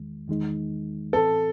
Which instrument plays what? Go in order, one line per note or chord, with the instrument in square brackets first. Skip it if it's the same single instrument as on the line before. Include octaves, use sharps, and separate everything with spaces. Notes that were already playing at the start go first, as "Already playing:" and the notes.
Already playing: [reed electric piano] E2 D#3 G#3
E2 D#3 G#3 D#4
[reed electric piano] A2 E3 C4 [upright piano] A4